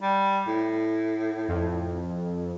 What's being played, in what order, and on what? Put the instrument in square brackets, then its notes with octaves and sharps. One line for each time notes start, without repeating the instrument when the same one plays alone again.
[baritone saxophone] G3
A2
[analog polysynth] F2